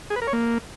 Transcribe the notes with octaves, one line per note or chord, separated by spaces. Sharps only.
G#4
B4
A#4
C#5
A#3